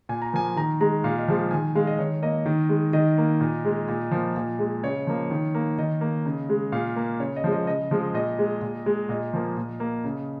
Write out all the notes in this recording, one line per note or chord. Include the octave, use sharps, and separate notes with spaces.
A#2 G#5
A#5
F3 A#3 G#5
D#3 A#5
G#3 A#5
A#2 F5
D#5
F3 G#3 F5
D#3 G#5
G#3 F5
D#5
D#3 C#5
A#3 D#5
D#3
G#3
D#3 D#5
A#3
A#2
G#3
A#2
F3 A#3
A#2
G#3
C#3 C#5
F3 A#3
D#3
A#3
D#3 D#5
A#3
C#3
G#3
A#2 F5
A#3
C#3 C#5
D#5
F3 G#3
D#5
C#3 D#5
F3 G#3
A#2 D#5
G#3
A#2
G#3
A#2 D#5
F3 A#3
A#2
A#3
C#3